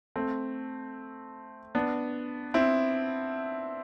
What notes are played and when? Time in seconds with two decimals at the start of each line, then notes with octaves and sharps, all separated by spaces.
0.16 A3 C4
1.75 B3 D4
2.54 C4 E4